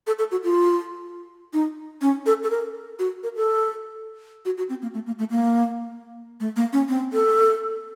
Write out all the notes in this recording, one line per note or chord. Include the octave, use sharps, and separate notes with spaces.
A4
A4
F#4
F4
D#4
C#4
A4
A4
A#4
F#4
A#4
A4
F#4
F#4
C4
A#3
A3
A#3
A3
A#3
A3
A#3
C#4
C4
A4